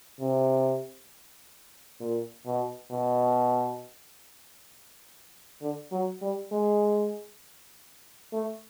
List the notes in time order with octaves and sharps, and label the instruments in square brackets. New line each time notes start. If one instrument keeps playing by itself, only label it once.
[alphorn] C3
A#2
B2
B2
D3
F#3
G3
G#3
A3